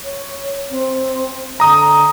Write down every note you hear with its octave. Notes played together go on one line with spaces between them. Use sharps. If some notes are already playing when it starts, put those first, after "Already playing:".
C#5
C4
D3 A#5 D#6